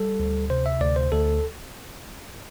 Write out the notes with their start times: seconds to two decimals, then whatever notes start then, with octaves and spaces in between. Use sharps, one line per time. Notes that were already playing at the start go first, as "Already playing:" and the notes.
Already playing: G3 A4
0.20 D2
0.50 C3 C5
0.66 E5
0.81 D2 D5
0.96 C5
1.12 D2 A4